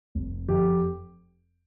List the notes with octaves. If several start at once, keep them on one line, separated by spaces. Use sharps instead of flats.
F1
F2 G4